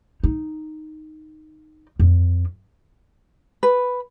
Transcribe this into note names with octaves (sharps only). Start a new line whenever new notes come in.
D#4
F2
B4